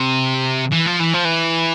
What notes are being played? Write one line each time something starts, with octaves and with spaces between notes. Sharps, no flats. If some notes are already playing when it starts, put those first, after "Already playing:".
Already playing: C3
E3
F3
E3
F3
E3